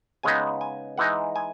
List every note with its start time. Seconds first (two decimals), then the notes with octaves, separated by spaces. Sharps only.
0.23 C#3 G#3 B3 D#4 G#5
0.61 G#5
0.98 E3 G#3 D#4 F#5
1.36 G#5